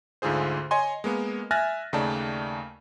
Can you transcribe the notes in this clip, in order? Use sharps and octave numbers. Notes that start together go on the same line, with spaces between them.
D2 G#2 D3 F4 G#4 C5
C#5 D#5 G#5 C6
G#3 A#3 B3
E5 G#5 F6 F#6 A6 A#6
D#2 C#3 A3 D#4 D5 A5